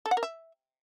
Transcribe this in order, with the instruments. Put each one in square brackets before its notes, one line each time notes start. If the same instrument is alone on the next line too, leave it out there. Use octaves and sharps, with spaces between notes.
[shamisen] A4
F#5
A#4
E5